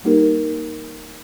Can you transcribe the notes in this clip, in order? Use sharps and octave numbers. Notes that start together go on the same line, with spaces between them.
G3 A#3 D#4 G4 A#4